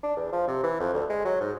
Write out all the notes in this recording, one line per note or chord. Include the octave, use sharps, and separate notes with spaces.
D4
E2
F3
C3
E3
F2
D2
G#3
F#3
G#2